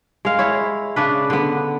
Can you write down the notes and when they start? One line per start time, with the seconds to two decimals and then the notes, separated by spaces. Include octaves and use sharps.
0.25 G#3 F5
0.39 E4 C#5
0.96 C#3 D4 B4
1.30 D3 B3